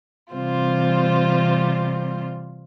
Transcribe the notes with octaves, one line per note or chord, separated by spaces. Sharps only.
C3 E3 G3 C4 F4 C5